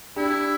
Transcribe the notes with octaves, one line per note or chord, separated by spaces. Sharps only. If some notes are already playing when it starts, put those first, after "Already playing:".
D4 E4 G4